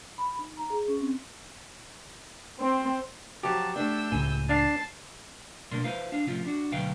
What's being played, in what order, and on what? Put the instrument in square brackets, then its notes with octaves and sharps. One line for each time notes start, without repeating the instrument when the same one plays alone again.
[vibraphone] B5
D#4
A#5
G#4
C#4
C4
[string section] C4
[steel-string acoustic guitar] F3 F#3 [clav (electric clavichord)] G4 [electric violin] A5
[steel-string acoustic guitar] A3 D4 [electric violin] E6 G6
[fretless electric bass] C#2 A2 [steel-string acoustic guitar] G#5
[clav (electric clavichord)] D4 F5 [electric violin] A5 C7
[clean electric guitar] B2 G#3 A#3 D4 A#4 C6
E4 B4 C5 F5
D4 F5
A2 C3 F3 C4 C#4 F4
D4 F#4
D2 B2 F#3 B4 F5 G5